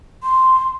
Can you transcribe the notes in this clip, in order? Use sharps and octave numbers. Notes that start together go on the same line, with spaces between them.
C6